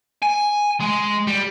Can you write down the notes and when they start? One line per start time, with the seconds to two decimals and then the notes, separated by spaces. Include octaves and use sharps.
0.22 G#5
0.80 G#3
1.27 G3